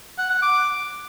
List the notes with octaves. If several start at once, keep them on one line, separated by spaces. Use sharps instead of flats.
F#5
F#5
D6